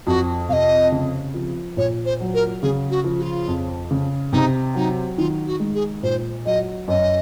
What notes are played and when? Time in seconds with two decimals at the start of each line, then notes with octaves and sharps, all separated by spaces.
0.07 F2 F#4
0.49 C3 F5
0.53 D#5
0.92 C#3
1.34 F3
1.77 A#2 C#5
2.05 C5
2.20 F#3
2.34 A#4
2.62 C#3 G#4
2.91 F#4
3.04 F3
3.19 F#4
3.22 F4
3.48 F2
3.91 C#3
4.33 C3 D#4
4.75 F#3 D#4
5.18 D#3 F4
5.47 F#4
5.60 G#3
5.75 G#4
6.03 A#2 C5
6.45 F#3 D#5
6.88 F#2 D#5